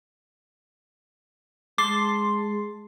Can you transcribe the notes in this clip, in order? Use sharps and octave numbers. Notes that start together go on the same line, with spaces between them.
G#3 A5 C6 D6